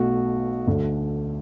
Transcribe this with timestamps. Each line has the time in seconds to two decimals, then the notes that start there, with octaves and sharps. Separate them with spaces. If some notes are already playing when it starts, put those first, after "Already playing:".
Already playing: B1 B2 A3 F#4
0.67 D2 D3 A3